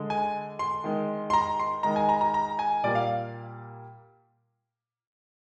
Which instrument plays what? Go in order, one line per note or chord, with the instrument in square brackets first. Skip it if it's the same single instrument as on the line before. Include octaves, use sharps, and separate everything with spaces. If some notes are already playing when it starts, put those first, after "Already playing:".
Already playing: [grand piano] D3 G#3
G#5
C6
D#3 G#3
C6
A#5
C6
D#3 G#3 A#5
G#5
A#5
A#5
A#5
G#5
A#2 G3 A#3 D5
F5